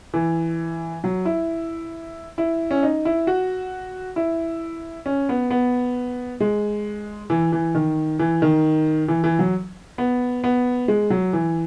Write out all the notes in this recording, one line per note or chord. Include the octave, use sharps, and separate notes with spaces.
E3
F#3
E4
E4
C#4
D#4
E4
F#4
E4
C#4
B3
B3
G#3
E3
E3
D#3
E3
D#3
E3
E3
F#3
B3
B3
G#3
F#3
E3